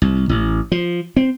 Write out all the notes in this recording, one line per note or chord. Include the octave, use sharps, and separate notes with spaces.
C2
A1
F3
C4